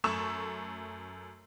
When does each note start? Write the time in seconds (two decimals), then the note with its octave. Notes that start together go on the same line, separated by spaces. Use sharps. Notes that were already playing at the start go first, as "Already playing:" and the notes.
0.04 F#2 A3 A4 C#6 E6 E7